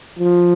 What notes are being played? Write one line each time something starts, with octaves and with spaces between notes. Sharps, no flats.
F3